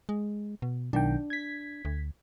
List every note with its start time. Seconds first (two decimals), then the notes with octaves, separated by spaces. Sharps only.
0.09 G#3
0.62 B2
0.93 B1 D#3 D4 G5
1.30 G#6 B6
1.85 D2